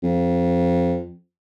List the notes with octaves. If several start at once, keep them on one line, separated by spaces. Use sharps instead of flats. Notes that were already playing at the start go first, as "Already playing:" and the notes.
F2